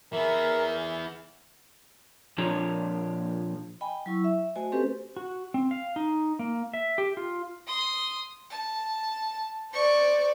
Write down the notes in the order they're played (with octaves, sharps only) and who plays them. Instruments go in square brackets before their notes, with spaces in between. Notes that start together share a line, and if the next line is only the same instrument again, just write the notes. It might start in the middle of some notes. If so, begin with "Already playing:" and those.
[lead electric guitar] E3 B3 [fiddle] G#4 E5 [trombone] A#4
[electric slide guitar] A#2 F3 D4 F4 C#5 A#5
[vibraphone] D#5 G5 G#5 B5
F#3 E4 C#6 E6
E5
A3 F#4 C5 D#5 G#5
C4 C#4 G4 A4 B4 C5
[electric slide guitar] F#4
C4
F5
D#4
A#3
E5
G4
F4
[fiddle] C6 D#6
A5
[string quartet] C5 D5 [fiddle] C#6